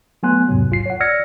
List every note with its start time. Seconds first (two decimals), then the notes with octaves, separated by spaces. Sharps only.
0.23 F#3 A3 B3 G#5 C6 F#6
0.48 E2 G#2 C3 F#3
0.70 B1 F4 C7
0.86 C#5 F#5
1.00 D5 E6 F6 G#6 A#6 C#7